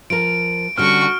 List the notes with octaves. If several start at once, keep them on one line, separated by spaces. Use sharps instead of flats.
F3 A#4 D7
D3 G3 C#4 F#4 C#6 F6 D7